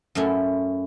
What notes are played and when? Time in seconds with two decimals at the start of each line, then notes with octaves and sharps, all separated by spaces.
0.15 F#2 A3 C#4 E4